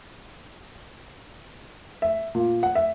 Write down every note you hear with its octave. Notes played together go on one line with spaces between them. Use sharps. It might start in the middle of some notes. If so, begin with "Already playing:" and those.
E5
A#2
F#5
E5